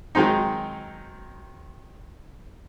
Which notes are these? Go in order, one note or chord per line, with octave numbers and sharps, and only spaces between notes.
D#3 F#3 G#3 C4 D#4